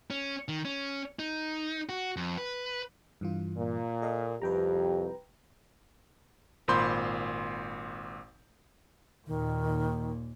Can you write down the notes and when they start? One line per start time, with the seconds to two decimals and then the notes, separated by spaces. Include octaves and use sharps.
0.10 C#4
0.48 D#3
0.65 C#4
1.19 D#4
1.89 F#4
2.16 F2
2.38 B4
3.21 G2 E3 F4
3.57 A#2
4.02 A4 D#5 F5
4.42 C2 F2 G4 B4 G5 A#5
6.68 G#1 A#2 C5 B5 C6 G6
9.27 D#2 A#2 D#3